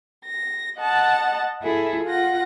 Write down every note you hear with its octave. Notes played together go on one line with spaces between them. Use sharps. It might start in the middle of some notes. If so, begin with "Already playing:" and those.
A#6
D#5 F#5 A5
E4 G#4 A4
F4 F#5 A#6